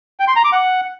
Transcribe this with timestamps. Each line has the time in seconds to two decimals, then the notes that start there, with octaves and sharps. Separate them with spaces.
0.20 G5
0.28 C6
0.36 A#5
0.44 D6
0.53 F#5